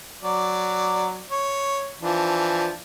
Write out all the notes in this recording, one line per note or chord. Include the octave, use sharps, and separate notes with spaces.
F#3 D5
C#5
E3 F3 D4